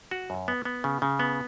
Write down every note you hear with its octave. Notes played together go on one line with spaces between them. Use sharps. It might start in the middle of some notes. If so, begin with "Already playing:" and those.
F#4
F#2
B3
B3
C#3
C#3
B3